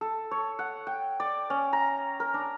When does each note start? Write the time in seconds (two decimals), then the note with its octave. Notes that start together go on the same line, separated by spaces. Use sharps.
0.01 A4
0.31 C#5
0.59 F#5
0.87 G5
1.20 D5
1.50 C#4
1.73 A#5
2.20 A#4
2.34 D4